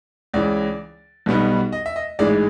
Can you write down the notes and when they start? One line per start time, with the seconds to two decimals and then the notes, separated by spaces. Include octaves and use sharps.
0.34 C#2 C#3 E3 D5
1.26 B1 B2 G3 B3 D#4
1.72 D#5
1.86 E5
1.96 D#5
2.19 A1 G#2 E3 G#3 D5